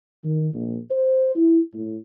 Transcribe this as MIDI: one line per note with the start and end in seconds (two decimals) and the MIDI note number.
0.24 0.49 51
0.54 0.78 34
0.91 1.31 72
1.36 1.59 64
1.73 1.97 45